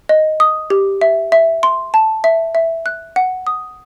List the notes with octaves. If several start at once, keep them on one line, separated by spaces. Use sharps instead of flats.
D#5
D#6
G4
E5
E5
C6
A5
E5
E5
F#6
F#5
D#6